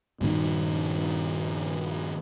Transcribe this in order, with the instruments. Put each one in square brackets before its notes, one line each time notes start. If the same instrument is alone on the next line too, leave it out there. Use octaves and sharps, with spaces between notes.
[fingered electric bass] G2 A#2 D#3